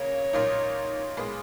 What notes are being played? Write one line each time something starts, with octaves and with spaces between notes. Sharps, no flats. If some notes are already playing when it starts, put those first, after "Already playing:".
Already playing: C#3 F#3 A#3 C#5
A#2 F#3 A#3 D#4
A#2 G#3 B3